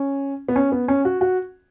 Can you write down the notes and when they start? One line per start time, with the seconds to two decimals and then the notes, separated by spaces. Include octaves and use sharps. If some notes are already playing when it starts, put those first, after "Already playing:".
Already playing: C#4
0.48 B3
0.56 C#4
0.72 B3
0.88 C#4
1.05 F#4
1.21 F#4